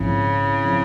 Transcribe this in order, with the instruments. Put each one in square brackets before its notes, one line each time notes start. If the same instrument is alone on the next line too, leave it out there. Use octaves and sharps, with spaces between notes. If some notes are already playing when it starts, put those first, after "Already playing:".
Already playing: [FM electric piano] A#1 G#2 F3 C4 E4 [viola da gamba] C#3
[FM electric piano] F3 C4 E4